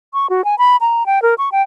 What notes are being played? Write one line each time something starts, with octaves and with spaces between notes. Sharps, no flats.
C#6
F#4
G#5
B5
A#5
G5
A#4
C#6
G5